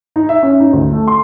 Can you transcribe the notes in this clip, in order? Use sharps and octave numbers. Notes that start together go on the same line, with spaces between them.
D#4
E5
C#4
D#4
D2
A3
C6